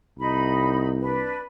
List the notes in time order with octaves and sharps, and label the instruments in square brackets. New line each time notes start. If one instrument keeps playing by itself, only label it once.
[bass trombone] C2 [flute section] D#4 B5
[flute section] D4 B4